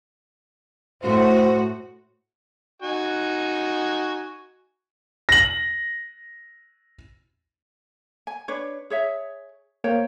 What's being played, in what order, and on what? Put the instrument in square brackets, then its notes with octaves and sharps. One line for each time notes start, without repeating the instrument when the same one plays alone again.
[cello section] A2 F#4 [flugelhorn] C5
[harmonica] D#4 F#4 G#5
[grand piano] A#6 F#7
[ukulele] G#5
D4 B4 C#5
G#4 C#5 E5
[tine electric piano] A#3 [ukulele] C5 C#5 G5